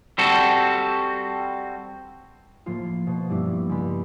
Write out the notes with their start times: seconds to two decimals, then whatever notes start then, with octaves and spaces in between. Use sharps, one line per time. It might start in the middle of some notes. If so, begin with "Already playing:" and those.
0.18 G3 C4 F#4 A4
2.66 A2 F3 A#3 F4
3.07 B2
3.29 G2 G3 A#3 D4 E4
3.69 C#2 B5